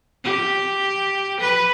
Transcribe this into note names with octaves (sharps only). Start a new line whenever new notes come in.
G4
B4